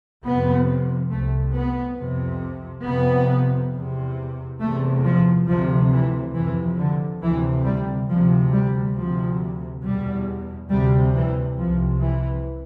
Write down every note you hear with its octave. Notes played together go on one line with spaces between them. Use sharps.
F2 C3 B3
C2 C3 A3
B3
F2 C3
F2 C3 B3
E2 C3
E2 C3 A3
F3
D2 C3 F3
E3
F2 C3 E3
D3
D2 C3 E3
G3
D2 C3 F3
G3
D2 C3 F3
E2 B2 G3
D2 C3 G3
E3
C2 C3 F3
E3